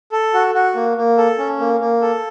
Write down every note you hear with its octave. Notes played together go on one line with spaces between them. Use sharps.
A4
F#4
F#4
A#3
A#3
A4
C#4
A#3
A#3
A4